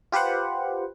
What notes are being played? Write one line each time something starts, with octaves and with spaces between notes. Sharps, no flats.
F4 G4 B4 C5 F#5